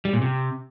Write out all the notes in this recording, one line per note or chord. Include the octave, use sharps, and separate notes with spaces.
G3
A#2
C3